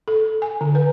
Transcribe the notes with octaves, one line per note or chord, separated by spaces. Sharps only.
A4
G#5
D3
B4